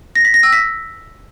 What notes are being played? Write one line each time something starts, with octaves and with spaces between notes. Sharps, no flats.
A#6
B6
A#6
E6
B6